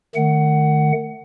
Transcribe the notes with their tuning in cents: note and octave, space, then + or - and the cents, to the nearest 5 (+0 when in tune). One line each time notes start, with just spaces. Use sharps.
D#3 -30 A3 +0 F#5 +15